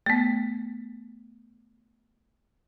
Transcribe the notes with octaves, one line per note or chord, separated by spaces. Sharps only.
A3 B3